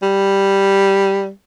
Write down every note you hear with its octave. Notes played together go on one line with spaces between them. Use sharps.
G3